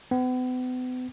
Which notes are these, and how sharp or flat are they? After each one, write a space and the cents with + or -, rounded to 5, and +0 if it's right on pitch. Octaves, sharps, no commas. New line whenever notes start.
B3 +40